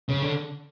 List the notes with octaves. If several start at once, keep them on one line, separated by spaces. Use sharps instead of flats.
C#3
D3